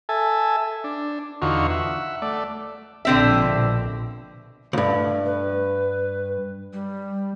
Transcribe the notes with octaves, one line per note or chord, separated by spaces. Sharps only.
A4 E5 G#5 A5
D4
E2 D3 D#4 F4 F#4 C#6
E5 F#5
A3 D5
A#1 B2 D3 C4 E5
C#2 G2 A3
B4
G3